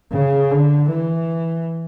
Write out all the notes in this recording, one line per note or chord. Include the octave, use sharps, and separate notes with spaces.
C#3
D3
E3